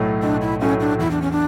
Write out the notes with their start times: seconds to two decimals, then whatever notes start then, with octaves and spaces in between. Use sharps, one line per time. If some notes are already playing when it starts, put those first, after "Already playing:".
Already playing: B1 A2 F#3 A3
0.23 B1 D4
0.41 E4
0.61 A2 F#3 A3 C#4
0.80 D4
0.99 E2 E4
1.11 D4
1.22 C#4
1.31 D4